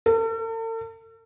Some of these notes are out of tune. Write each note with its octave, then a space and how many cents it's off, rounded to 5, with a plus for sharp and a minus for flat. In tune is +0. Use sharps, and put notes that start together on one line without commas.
A4 +45